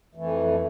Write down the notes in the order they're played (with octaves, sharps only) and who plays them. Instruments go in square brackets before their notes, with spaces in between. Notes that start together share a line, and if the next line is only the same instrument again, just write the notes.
[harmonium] F2 E3 A3